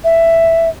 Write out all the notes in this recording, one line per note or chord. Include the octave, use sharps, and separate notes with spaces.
E5